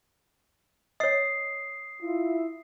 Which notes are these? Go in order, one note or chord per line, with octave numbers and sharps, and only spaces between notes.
C#5 D#5 D#6 C7
E4 F4 E5